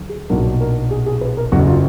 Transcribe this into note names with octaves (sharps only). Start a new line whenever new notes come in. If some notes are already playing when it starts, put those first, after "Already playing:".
Already playing: D2 D3 F#3
G#4
B1 A#2 F#3 D4 A#4
A#4
G#4
G#4
B4
A#4
F#1 F#2 D3 F#3 F#4
F4